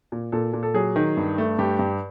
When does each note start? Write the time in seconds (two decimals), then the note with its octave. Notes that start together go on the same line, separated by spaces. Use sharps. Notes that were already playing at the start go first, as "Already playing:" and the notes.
0.12 A#2
0.32 A#2 A4
0.53 A#2
0.63 A4
0.74 F#3 G#4
0.96 D#3
1.17 G2
1.38 A3
1.59 G2 G4
1.79 G2